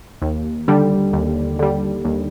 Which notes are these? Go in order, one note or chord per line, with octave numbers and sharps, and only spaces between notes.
D#2
D3 G3
D#2
D3 G3
D#2